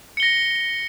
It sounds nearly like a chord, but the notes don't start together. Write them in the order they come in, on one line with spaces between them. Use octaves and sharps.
C#7 G7 A#6